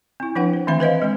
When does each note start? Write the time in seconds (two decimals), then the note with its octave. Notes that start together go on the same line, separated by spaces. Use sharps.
0.20 C4 E4
0.35 F3 D4 B4 F#5 G5
0.53 C5
0.67 D#3 E3 A3 C4 E5 B5
0.80 B4 C5 D#5 F5
1.02 G#3 C4